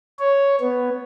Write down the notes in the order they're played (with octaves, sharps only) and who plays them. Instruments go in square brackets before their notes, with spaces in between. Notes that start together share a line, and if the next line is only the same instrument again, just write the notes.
[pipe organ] C#5
B3